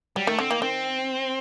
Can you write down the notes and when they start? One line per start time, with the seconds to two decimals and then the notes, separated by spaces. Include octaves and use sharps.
0.16 F#3 G3
0.27 D#3 A3
0.39 D3 C4
0.50 D#3 A#3
0.62 D#3 C4